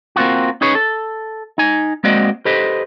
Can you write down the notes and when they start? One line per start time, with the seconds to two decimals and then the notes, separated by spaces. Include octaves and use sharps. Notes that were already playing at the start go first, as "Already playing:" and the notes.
0.16 A#3 C4 F4 F#4
0.61 C#4 D#4 G#4 B4 C#5
0.75 A4
1.58 D#4 G#5
2.04 G#3 A#3 C4 F#4 D5 D#5
2.45 G4 A4 B4 C5 D#5